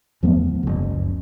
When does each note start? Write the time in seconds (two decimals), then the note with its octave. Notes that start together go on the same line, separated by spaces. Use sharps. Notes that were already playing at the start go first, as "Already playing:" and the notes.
0.23 E2 F3 A3 B3
0.63 F#1 C#2